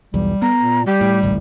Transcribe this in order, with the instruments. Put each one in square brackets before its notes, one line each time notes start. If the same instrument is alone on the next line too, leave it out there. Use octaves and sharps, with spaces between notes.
[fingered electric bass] B1 E2 [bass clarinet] G3
[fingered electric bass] B3 [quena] A#5
[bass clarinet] A#2
[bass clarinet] G3 [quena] G4
[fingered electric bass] A2
G#1 C#2 A2